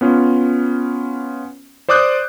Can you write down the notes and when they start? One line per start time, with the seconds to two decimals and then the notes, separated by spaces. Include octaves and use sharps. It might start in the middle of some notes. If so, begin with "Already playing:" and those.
0.01 B3 C#4 F4
1.89 C5 D5 D6 D#6 F#6 G6